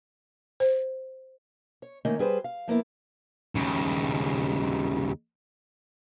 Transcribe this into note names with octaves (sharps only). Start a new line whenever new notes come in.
C5
C#5
D#3 A3 A#3 C#4 D#4
G3 G#4 B4 C5
F5
F3 A#3 B3 E4
D#2 C#3